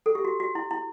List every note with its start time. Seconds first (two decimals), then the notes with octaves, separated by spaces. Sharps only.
0.06 A4
0.15 G4
0.25 F#4
0.40 F#4
0.55 E4
0.71 E4